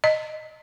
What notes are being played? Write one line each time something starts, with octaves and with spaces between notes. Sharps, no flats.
D#5